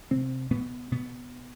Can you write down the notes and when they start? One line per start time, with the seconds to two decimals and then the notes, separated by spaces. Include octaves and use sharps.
0.11 C3 C4
0.51 B2 B3
0.92 B2 B3